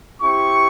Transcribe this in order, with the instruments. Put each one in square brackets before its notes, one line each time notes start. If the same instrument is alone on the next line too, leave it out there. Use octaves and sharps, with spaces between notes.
[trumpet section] C4 E4 G4 C#6